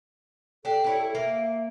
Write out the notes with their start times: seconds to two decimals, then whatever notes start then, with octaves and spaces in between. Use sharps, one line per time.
0.65 D4 G4 A4
0.84 D4 E4 C#5
1.15 A#3 E5